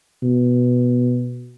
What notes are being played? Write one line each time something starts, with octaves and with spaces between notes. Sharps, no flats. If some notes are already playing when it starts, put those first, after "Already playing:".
B2